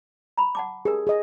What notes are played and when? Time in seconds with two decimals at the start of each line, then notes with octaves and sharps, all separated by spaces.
0.37 A#5 B5
0.55 F#5 A5 D6
0.85 G4 G#4 A#4
1.07 G#4 D#5